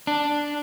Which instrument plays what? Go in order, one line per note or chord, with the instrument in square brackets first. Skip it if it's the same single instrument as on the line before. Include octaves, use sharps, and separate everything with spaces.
[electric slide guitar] D4